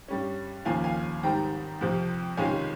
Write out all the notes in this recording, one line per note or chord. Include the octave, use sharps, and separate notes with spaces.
G2 G3 C#4
D#2 C#3 F3 A#3 F5 G#5
F5 G#5
G#2 D#3 G3 C4 G5 A#5
F2 C3 F3 C4
C#2 C3 D#3 G#3 C#4 F5 G#5